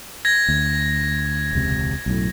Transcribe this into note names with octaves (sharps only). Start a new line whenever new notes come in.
G#6 A#6
D2
E1 C#2 C3
B1 F#2 A2